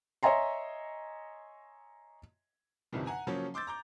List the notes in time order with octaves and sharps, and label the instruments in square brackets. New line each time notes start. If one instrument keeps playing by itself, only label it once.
[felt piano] C#5 D#5 E5 G#5 A#5 C6
[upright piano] G1 C2 C3 D#3 F3
F#5 G#5 A#5
C#3 F3 F#3 A#3 C#4
C6 D6 E6 G6 A6
A#5 D6 G6